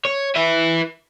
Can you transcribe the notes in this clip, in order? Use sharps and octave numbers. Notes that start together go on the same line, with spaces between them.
C#5
B4 E5